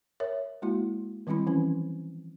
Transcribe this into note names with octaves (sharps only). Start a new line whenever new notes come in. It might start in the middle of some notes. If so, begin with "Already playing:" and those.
A#4 C#5 E5
G#3 A#3 E4 F#4
D#3 G3 C4 E4 B5
E3 F3 C4 C#4